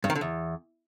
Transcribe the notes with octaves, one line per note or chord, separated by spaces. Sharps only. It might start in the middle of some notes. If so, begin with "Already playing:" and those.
G2
D#3
D3
E2